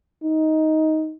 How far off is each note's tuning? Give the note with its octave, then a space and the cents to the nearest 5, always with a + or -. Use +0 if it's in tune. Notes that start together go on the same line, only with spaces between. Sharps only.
D#4 +10